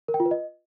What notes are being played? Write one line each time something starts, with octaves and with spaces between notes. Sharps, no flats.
A#4
G5
F4
B4
D#5